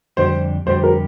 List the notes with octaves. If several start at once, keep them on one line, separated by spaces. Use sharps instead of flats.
F2 D3 G3 D4 G4 C5
F2 D3 G3 D4 G4 C5
A#4